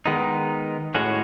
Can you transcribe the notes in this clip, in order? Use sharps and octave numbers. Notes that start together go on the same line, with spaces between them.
D#3 G#3 B3 D#4
A2 G#3 C#4 F#4